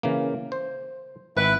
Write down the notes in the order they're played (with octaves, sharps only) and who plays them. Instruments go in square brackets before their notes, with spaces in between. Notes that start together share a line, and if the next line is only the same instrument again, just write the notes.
[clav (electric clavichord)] C#3 E3 A#3
C5
[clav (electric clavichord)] G#1 [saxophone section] E4 B4